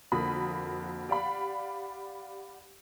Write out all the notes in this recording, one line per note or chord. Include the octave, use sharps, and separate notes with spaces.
F2 D3 A#3 F#4 B5 D#6
G4 D5 F5 F#5 B5